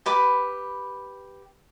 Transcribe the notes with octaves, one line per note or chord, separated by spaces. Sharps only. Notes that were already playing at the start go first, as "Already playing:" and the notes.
G4 B4 B5 D6